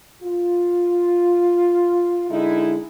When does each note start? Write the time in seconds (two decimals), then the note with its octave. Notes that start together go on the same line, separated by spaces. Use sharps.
0.22 F4
2.28 D3 G#3 D#4 E4